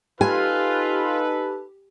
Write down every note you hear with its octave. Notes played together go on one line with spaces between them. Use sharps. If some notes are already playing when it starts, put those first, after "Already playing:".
D#4 F4 G4 A4 B4 G#5